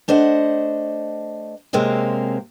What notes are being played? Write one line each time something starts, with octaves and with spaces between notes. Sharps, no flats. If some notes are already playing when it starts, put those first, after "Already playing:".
A3 D4 C5 D#5 F#5
C3 G#3 A#3 C4 C#4